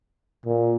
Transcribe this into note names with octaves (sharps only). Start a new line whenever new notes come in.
A#2